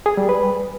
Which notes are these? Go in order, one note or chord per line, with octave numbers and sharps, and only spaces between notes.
G#4
G3
B4